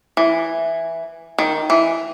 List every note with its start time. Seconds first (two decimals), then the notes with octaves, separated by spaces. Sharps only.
0.17 E3
1.38 D#3
1.70 E3